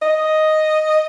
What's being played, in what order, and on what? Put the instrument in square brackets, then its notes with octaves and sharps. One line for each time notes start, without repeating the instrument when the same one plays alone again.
[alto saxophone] D#5